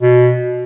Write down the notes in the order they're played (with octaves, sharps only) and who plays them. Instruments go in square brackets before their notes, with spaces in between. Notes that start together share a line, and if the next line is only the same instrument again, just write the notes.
[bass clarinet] B2